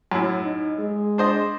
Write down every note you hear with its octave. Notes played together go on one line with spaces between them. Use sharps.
F#2 A2
D#4
G#3
D4 C5 D#5